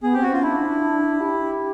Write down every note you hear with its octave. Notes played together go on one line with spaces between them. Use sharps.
B3 G#4
C4 G4
F#4
C#4 F4
D4 E4
G4